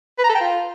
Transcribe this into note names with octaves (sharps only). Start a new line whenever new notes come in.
B4
A#5
A4
G5
F4